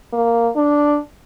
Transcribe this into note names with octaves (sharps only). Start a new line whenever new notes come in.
A#3
D4